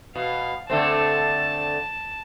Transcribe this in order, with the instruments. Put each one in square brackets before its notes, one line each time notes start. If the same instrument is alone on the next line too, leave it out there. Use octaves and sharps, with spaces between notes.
[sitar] B2 [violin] F5
[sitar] D3 A3 C4 [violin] A5